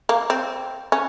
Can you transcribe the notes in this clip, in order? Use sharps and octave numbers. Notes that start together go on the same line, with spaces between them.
A#3
C4
C#4